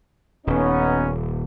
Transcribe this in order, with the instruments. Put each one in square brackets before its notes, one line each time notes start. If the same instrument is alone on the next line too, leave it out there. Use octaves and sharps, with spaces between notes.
[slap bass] D#1 [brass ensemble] B3 C#4 D#4